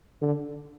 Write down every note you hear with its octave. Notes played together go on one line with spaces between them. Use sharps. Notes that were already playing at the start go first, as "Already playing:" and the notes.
D3